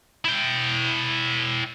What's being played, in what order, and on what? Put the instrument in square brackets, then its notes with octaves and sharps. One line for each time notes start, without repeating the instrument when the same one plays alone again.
[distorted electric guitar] E4 G5